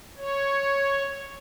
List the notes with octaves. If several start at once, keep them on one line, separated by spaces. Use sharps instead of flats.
C#5